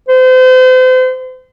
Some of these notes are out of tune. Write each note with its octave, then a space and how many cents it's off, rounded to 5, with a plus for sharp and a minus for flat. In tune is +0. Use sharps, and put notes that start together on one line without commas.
C5 -35